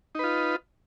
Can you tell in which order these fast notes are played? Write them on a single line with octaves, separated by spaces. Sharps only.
D#4 B4 F4